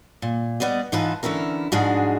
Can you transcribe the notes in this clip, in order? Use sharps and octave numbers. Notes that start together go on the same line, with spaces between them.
A#2
G3 B3 D5 D#5
G#2 E3 D#4 F4 B4 A5
D3 E3 C#4 E4 A#4
G#2 F3 G#3 D4 F#4 G#4